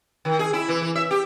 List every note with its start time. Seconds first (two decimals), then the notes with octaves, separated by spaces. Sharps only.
0.25 D#3
0.39 G#4
0.53 E4
0.69 E3
0.81 E3
0.95 E5
1.11 G4